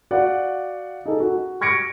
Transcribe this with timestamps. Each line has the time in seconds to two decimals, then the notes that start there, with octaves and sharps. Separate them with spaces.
0.11 F#4 D5 F5 F#5
1.05 D#4 G#4 A4
1.20 F#4
1.61 C#6 G#6 A#6 C#7 D7